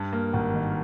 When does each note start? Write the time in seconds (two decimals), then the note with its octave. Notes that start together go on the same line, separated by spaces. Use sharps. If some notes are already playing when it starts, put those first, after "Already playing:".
Already playing: G2
0.13 A#3
0.33 G#1
0.54 D#3